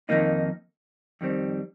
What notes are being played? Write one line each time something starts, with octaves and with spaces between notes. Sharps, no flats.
F2 D#3 A#3 D#4
F2 D#3 G3 C4